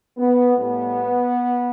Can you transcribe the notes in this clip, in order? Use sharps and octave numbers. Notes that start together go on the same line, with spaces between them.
B3
A2 G3 B3